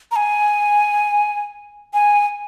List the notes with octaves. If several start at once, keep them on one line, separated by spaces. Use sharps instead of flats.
A#5
G#5
G#5